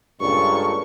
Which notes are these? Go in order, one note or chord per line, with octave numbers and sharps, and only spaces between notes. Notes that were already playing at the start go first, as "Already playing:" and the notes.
C#2 G2 A#2 A4 C#6